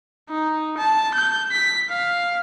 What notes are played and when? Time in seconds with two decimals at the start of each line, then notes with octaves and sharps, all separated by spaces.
0.29 D#4
0.78 A5
1.15 G6
1.52 B6
1.90 F5